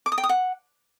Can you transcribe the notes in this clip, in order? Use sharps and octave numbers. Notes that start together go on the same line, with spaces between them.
D6
D#6
G5
D#6
F#5